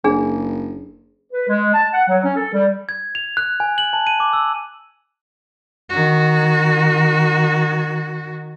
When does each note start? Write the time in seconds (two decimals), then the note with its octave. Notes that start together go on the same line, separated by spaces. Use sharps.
0.04 F#1 D4 G#4
1.32 B4
1.49 G#3
1.74 A5
1.93 F#5
2.08 F#3
2.23 C#4
2.36 A4
2.52 G3
2.89 G#6
3.15 F7
3.37 F#6
3.60 G#5
3.78 F#7
3.93 A5
4.07 D#7
4.20 D6
4.33 E6
5.89 D#3 F#4